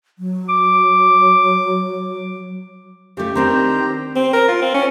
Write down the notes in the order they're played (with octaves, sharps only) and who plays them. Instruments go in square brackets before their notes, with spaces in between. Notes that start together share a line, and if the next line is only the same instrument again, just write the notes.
[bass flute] F#3
[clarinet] D6
[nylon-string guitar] C#3 A3 [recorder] G4
[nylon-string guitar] D#3 C4 D4 [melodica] C5 A#5
[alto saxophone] C4
A#4
F4
C4
C#4